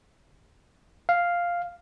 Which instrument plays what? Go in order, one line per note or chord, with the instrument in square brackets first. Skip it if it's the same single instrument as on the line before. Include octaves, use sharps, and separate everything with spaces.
[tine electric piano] F5